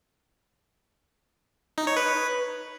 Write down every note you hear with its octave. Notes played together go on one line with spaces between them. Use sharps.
D#4
C#5
B4